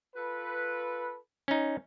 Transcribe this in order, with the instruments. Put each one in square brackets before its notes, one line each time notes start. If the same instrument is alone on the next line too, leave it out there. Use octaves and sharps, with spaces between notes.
[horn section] F4 A4 B4
[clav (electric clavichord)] C#4 D#4